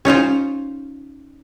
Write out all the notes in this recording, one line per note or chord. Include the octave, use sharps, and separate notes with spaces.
C#4 D#4 F4 C5